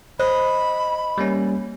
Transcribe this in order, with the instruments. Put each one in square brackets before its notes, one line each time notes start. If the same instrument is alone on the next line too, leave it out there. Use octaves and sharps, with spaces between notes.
[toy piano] C5 [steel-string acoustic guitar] D#5 [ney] B5
[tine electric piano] G3 A#3 C#4